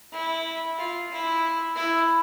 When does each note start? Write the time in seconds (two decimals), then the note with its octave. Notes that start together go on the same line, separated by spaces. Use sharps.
0.13 E4
0.78 F4
1.11 E4
1.76 E4